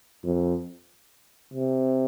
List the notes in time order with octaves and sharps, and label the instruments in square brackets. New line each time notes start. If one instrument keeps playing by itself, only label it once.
[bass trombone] F2
C3